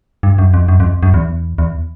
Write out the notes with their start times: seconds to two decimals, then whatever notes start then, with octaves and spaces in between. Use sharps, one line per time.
0.23 G2
0.38 F#2
0.54 F2
0.68 F#2
0.80 F2
1.03 F#2
1.14 E2
1.58 E2